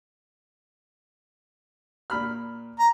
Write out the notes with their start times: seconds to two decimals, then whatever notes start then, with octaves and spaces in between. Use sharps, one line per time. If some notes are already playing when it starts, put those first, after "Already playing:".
2.10 A#2 B5 F6
2.79 A#5